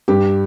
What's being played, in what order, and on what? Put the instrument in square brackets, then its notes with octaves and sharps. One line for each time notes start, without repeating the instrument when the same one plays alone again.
[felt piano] G2 G4